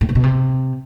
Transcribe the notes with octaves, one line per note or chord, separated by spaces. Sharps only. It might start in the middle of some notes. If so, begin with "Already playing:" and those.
A2
A#2
B2
C3